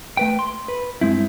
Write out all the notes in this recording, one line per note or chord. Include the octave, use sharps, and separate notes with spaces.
A3 B4 G5
C6
B4
G2 G#3 C4 E4